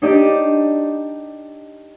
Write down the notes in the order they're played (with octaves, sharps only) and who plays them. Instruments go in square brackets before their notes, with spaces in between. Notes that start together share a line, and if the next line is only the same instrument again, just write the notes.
[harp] D4 D#4 G4 D5 D#5